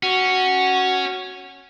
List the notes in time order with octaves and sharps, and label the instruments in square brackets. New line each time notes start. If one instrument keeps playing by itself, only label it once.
[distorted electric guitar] C#4 [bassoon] F#4